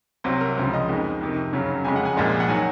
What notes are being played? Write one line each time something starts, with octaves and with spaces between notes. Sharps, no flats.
C2 C3 F#3 C5
A#4
C#2 C#3 F3 C5
D#5
F2 D#3 G#3
F2 C3 D#3
F#2 C#3 F#3
F2 C#3 G#3 G#5
F#5
G#5
C2 A#2 F3 G#3
F#5
D#3 F#3 G#5